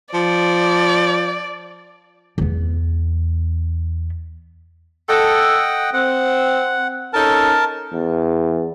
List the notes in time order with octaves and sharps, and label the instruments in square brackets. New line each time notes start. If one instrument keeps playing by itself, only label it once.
[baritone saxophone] F3 [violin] D5
[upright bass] E2 B3
[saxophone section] A4 [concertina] D#5 F#5 G5
[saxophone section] C4 [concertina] F#5
[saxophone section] C#4 D#4 A4 [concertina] A#4 A5
[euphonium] E2